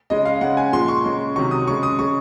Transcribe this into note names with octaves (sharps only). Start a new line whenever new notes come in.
C#3 G#3 D#5
F5
C#3 G#3 F#5
G#5
A#2 F3 G#3 C6
C#6
C#3 G#3
C3 D#3 F#3 C#6
D#6
C#3 G#3 C#6
D#6
C#3 G#3 C#6